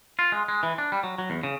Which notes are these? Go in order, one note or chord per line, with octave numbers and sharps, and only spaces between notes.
F4
G#3
G#3
E3
D4
G3
F#3
F#3
E2
C#3